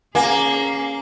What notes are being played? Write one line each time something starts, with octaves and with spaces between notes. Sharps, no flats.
A#3 C#4 G#4 G#5